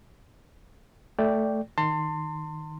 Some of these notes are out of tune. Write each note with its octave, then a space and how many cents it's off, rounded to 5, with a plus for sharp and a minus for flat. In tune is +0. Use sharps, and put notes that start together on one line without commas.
A3 +0 D5 -10 G5 +0
D#3 +0 A5 +40 C6 +0